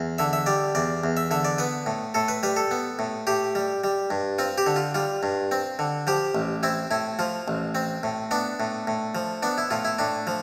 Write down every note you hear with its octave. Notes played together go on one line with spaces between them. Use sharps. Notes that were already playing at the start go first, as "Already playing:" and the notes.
Already playing: E2
D3 E5
E5
G3 D5
E2 D5
E2
E5
D3 E5
D5
B3 B4
A2
A2 A4
B4
G3 B4
A4
B3
A2
A2 G4
G3
G3
G2
C4 F4
G4
D3
F4
G3 F4
G2
C4
D3
F3 G4
A1
C4 E4
A2 E4
F3 F4
A1
C4
A2
B3 D4
A2
A2
F3
B3 D4
E4
A2 F4
E4
A2 D4
F3